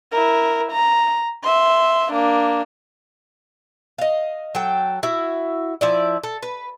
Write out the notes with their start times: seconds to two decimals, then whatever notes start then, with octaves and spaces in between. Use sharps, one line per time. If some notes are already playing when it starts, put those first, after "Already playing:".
0.11 E4 A#4
0.71 A#5
1.43 E5 C6
2.12 A#3 D4
3.98 D#5 F5
4.55 F#3 A4 G5
5.03 E4 F#4
5.81 F3 E4 D5
6.24 A4
6.43 B4